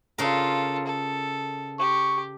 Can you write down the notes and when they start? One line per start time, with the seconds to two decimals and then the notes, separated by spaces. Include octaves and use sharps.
0.18 C#3 F4 A4 A#4
0.87 A4
1.79 G4 C#6